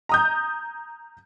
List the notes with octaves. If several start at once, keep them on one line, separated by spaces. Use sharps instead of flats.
A#5 D#6 G6